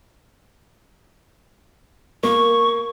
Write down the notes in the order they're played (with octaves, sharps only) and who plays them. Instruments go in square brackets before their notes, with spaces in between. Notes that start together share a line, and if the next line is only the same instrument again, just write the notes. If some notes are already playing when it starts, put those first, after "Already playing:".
[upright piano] A#3 [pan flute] C#6